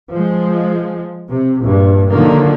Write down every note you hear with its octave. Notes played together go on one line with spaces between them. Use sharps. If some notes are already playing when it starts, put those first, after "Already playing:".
F3 G#3
C3
A#1 G2
D3 D#3 F3 F#3 A#3